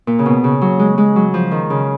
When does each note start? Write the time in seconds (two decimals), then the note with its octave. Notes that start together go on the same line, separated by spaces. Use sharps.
0.07 A#2
0.19 C#3
0.26 B2
0.44 C#3
0.61 F#3
0.79 G#3
0.98 G#3
1.16 F#3
1.34 F3
1.51 D#3
1.70 C#3